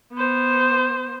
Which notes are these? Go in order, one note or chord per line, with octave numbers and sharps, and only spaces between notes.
B3 C5